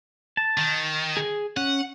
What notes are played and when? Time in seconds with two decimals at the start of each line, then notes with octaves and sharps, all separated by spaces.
0.37 A5
0.58 D#3
1.17 G#4
1.57 C#4 F#5